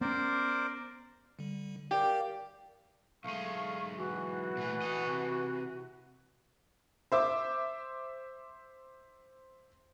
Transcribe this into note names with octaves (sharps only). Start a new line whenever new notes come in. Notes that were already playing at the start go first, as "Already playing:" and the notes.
B3 C#4 A#4 C5 D5
D3 G3
G4 A#4 D5 F5
B1 G#3 A3 F5 C#6
E3 F#4
A#2 A3
A4 D#5
C3
C5 E5 D6